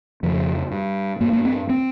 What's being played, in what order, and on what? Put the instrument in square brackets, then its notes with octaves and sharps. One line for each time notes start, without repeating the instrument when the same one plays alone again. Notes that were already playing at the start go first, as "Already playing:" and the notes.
[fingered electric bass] F2 C#3 F3
G2
G2 A#3
A#3
C4
C4